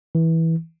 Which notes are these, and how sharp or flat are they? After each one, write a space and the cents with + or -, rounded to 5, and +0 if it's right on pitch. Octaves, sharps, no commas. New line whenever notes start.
E3 -15